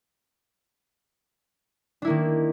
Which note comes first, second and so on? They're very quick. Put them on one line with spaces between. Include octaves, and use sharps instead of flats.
D4 E4 A#3 D#3